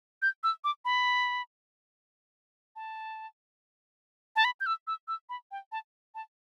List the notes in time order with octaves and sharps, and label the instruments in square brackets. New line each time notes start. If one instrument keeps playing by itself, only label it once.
[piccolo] G6
E6
D6
B5
A5
A5
B5
G6
E6
E6
E6
B5
G5
A5
A5